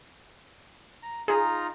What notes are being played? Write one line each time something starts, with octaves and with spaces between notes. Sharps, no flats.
A#5
D#4 F4 G#4 A#5